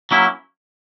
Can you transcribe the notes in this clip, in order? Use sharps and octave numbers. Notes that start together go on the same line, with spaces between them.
F#3 A#3 C#4 E4